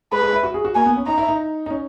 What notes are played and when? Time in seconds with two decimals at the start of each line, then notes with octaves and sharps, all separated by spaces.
0.12 G#3 B4
0.22 G#3
0.33 E4
0.43 F#4
0.54 G#4
0.65 F#4
0.75 A#3 G#5
0.86 B3
0.96 C#4
1.07 D#4 A#5
1.18 E4
1.28 D#4
1.66 D#4
1.70 C#4